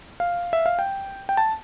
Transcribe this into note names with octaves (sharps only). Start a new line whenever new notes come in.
F5
E5
F5
G5
G5
A5